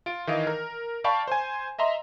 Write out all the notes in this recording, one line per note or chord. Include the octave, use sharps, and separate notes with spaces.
F4 D7
D#3 E3 D#5 F5
A#4
D5 F5 G5 A5 B5 C#6
C5 G#5
D#5 E5 A#5 C6